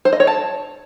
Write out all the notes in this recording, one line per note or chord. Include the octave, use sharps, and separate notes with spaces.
C5
D#5
C#5
A5